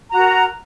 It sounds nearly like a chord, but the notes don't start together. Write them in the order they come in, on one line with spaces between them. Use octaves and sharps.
A#5 F#4 A#4